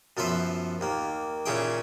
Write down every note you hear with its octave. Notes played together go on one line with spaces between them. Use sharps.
F#2 F3 B3 B4 C5 E5
D#2 A#3
A#2 C#3 C#4 E4 G#4 G5